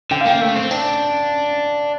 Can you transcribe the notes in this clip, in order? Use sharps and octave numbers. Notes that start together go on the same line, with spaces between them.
D3 G5
F5
A#3 G5
A3
C4
D4